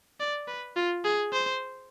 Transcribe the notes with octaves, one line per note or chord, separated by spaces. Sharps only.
D5
B4
F4
G#4
C5